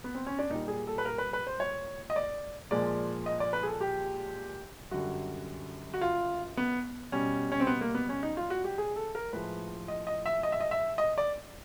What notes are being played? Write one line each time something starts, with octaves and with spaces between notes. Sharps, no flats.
B3
C4
C#4
D4
A#2 G3 D#4
G#4
A4
B4
A#4
B4
B4
C5
C#5
D#5
D5
A#2 F3 G#3 D5
D#5
D5
B4
G#4
A4
G4
F#2 D3 G3 F#4
F#4
F4
B3
B2 G3 C#4
C#4
C4
B3
A#3
B3
C#4
D#4
F4
F#4
G4
G#4
A4
A#4
A2 F3 G#3 B4
D#5
D#5
E5
D#5
E5
D#5
E5
D#5
D5